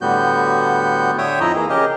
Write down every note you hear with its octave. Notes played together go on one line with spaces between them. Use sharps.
A2 D3 G3 B3 F#4 G6
D3 C#5 E5 G5 D#6
F2 F3 D#4 E4 D#5 A#5
E3 A#3 G#4
C#3 G4 G#4 A#4 D#5